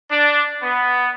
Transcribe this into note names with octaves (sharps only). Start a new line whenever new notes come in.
D4
B3